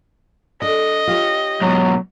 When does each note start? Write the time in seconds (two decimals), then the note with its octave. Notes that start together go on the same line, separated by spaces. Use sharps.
0.62 D4 A4 D5 D#5
1.07 F4 G4 C#5
1.62 G#2 B2 F#3